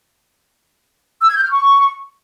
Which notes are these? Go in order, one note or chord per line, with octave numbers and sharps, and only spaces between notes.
E6
G#6
G6
F6
C#6